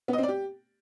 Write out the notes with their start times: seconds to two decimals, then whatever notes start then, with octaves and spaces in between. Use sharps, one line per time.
0.08 B3
0.13 D#5
0.18 C4
0.23 D5
0.28 G4